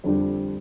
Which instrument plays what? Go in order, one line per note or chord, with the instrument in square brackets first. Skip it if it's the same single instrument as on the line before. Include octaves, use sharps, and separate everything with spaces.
[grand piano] F2 D3 G3 D4 G4